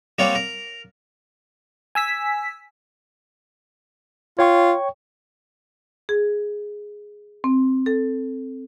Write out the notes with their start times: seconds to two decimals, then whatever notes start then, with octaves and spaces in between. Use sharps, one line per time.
0.19 G3 A#3 C4 C#5 D5 F#5
0.35 A#4
1.95 G#5 E6 B6
4.39 F4 C#5 G5 C#6
6.09 G#4
7.44 C4
7.86 A4